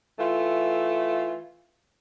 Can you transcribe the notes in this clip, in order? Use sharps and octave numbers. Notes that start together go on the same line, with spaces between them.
E3 A3 F4